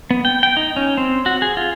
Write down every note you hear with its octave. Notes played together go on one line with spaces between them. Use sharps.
B3
G5
G5
D#4
C#4
C4
F#4
G#4
F4